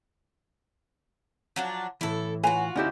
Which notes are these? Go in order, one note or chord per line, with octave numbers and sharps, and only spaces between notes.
F3 F#3 D4
A2 E3 E4 A4
F4 F#4 B4 C#5 G#5
D2 C#4 D#4 E4 G4